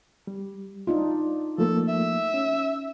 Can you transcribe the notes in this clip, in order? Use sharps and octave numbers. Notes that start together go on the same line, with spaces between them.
G3
D4 D#4 F4
F3 A3 A#3 A4
E5
C#4